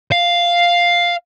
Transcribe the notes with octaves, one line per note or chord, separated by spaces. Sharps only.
F5